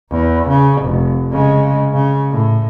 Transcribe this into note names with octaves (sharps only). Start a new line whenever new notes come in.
E2
C#3
F1
C#3 G#3
C#3
A2